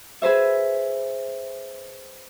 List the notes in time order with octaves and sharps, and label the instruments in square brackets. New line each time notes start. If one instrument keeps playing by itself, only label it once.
[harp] G#4 B4 C5 E5